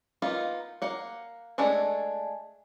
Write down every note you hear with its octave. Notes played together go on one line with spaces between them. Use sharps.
A#3 B3 D#4 F4
A#3 F#5
G#3 A3 D4 G#4 A4